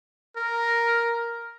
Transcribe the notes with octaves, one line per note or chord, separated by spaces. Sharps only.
A#4